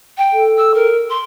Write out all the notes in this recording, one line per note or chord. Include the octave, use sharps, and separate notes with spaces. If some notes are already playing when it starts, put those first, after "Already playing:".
G5
A4
E6
A#4
C6